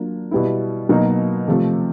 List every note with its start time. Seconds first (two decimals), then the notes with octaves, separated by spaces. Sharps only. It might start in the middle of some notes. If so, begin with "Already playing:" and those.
Already playing: F#3 A#3 D4 F4
0.31 B2 G3 B3 E4
0.89 B2 F#3 A#3 D#4
1.48 C3 F3 A3